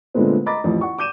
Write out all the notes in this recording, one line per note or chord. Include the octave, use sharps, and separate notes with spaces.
A#2 D3 G#3 A3 B3 C4
D#5 A#5 B5 D6 A6
A1 F2
F#5 C#6
D6 G6 D#7 E7